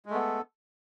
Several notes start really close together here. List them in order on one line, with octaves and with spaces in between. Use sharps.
G#3 A3 B3 A4